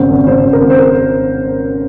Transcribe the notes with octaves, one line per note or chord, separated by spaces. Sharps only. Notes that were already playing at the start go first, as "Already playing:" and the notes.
Already playing: G#1 C#3 C5
G#1
C#3 C5
G#1
A#4
G#1
C5
A#4